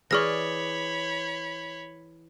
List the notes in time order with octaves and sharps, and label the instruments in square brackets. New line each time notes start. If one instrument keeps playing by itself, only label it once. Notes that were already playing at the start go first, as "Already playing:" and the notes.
[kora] E3 G#4 D5 [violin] C#5 B5 [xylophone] C#6 F6 A#6